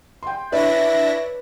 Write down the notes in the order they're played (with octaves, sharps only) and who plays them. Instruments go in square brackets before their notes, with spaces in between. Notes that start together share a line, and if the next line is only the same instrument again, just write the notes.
[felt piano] G5 C6
[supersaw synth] D4 E4 A#6 [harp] B4 [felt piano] C#5 D5 [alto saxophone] E5